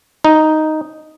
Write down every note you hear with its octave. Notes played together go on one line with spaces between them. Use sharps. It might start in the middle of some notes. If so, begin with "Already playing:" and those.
D#4